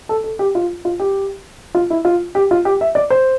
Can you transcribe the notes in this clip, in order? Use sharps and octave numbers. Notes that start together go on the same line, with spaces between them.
A4
A4
G4
F4
F4
G4
F4
E4
F4
G4
F4
G4
E5
D5
C5